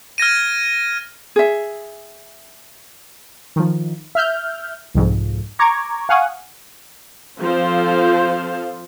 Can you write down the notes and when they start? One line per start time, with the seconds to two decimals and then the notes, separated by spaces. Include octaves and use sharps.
0.18 F6 G#6 A#6 D#7
1.36 G#4 E5
3.56 D#3 F3
4.15 E5 F6 G6
4.94 C2 F2 G#2
5.59 A#5 C#6 D6 G#6
6.09 F5 F#5 G#5 C#6 D#6
7.40 F3 C4 F4 A4 C5 F5